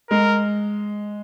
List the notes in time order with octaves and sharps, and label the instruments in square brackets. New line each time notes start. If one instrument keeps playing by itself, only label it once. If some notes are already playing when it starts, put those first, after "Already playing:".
[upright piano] G#3 [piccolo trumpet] A#4